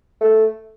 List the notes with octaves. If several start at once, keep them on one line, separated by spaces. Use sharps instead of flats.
A3